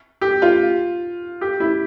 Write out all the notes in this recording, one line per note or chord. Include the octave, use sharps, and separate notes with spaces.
G4
F4
G4
E4